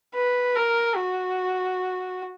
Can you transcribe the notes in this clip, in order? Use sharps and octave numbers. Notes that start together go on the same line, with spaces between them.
B4
A#4
F#4